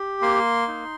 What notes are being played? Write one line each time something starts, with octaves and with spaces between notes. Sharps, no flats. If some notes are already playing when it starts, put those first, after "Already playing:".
Already playing: G4
A#3 C6
D#4